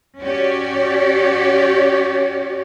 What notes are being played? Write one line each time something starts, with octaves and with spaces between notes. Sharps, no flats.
C#4 F#4 G4 C#5 D5